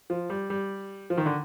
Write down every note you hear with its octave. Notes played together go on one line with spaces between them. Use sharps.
F3
G3
G3
F3
D#3
D3